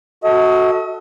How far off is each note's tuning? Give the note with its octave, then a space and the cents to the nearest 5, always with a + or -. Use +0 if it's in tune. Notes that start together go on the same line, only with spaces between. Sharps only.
F#4 +0 A4 +0 D#5 +40